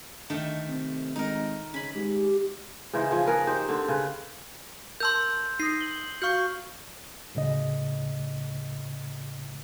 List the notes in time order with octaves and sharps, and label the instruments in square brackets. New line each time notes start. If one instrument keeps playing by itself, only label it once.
[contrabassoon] D3 [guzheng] D#3 A3
[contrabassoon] C3
[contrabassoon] G#1 [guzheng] D#4 A#4
[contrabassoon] C#3 [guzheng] G#5 B5 [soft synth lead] B6
[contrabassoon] G#2 [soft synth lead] G4
[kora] C#3 E3 D#4 C5
F3 G#4
G#4 A#4 B4
D#4 G4 C5
D3 C4
C#3 B4
[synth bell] A#4 A5 [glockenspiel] C6 E6 G6
[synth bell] D#4 D#6 [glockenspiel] C7
[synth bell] F#7 G7
[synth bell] F#4 F5 [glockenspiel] C#6 F6 G6
[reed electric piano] D2 A2 C#3 D#5